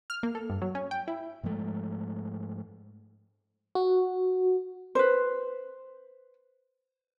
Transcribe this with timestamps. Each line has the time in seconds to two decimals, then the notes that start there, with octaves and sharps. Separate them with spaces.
0.10 F6
0.23 A#3
0.35 A4
0.50 G2
0.62 F#3
0.75 C#4
0.91 G5
1.08 E4
1.43 G#2 F3 G#3 A3
3.75 F#4
4.95 B4 C5